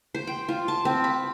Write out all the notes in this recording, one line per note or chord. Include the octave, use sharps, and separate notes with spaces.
C5
G5
F4
A5
C4
B5